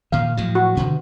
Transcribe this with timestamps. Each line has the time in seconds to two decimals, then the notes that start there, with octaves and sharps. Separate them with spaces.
0.12 A#2 D#3 F5
0.37 A2 F3 F#3
0.55 F#4
0.77 B2 D3 D#3